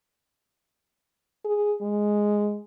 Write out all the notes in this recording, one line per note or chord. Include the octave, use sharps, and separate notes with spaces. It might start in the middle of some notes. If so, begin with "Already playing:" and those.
G#4
G#3